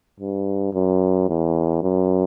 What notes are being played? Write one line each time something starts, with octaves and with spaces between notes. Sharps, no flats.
G2
F#2
E2
F#2